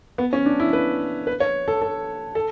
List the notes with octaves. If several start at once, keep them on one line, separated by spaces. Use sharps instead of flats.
B3
C#4
D4
E4
B4
B4
C#5
A4
A4
A4